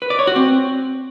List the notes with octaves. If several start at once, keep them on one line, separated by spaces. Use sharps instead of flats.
B4
D5
C#5
F#4
C4